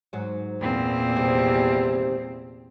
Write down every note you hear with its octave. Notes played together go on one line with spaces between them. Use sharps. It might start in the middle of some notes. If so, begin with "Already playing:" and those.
G#2 F#3
E2 A#2 C4
C3 D#3 G3